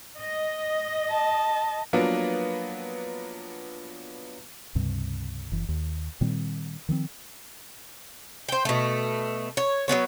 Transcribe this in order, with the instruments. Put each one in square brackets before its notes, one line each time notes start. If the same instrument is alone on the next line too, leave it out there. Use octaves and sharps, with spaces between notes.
[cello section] D#5
[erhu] A5
[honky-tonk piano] F3 F#3 A#3 B3 D4
[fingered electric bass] C#2 G2 C3
F#1 E3
D#2
A#2 D#3 G3 C4
D#3 F3 G#3 C4
[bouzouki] C5 G5
B2 A3
C#5
F#3 G3 B3 C#5